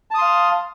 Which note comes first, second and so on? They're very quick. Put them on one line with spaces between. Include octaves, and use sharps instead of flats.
A5 D#6 C6 F5